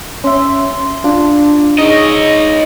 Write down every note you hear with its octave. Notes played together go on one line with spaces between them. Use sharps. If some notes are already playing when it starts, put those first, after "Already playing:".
C#4 E5 C6
D4 F4
D#4 G#4 C#5 D#5 A#6